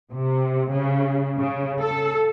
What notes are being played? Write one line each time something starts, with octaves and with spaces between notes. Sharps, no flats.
C3
C#3
C#3
A4